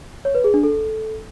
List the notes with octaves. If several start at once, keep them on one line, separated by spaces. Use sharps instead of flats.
C#5
B4
G#4
D4
A4